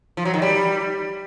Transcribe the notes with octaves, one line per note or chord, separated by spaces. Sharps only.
F3
F#3
D#3
G3